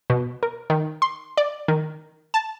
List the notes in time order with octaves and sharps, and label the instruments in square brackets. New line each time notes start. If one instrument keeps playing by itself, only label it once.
[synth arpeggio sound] B2
A#4
D#3
C6
D5
D#3
A5